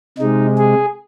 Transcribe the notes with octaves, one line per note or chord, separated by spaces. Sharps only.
C3 G#3 D#4
G#4